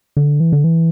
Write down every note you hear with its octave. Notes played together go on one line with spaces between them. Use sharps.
D3
E3
D3
E3